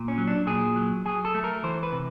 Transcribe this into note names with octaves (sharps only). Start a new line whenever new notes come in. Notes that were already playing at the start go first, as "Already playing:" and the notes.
Already playing: A#2
C#4
F#3
D4
A#2 G#4
F#3
F#3 G#4
A4
A3
A#4
E3 C5
B4
C3